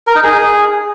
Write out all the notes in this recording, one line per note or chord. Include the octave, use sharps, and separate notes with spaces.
A#4
D#4
G#4